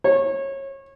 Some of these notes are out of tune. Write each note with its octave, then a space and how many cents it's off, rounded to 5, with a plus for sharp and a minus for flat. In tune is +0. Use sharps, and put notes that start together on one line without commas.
C#5 -25